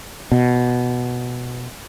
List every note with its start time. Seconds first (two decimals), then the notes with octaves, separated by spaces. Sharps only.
0.32 B2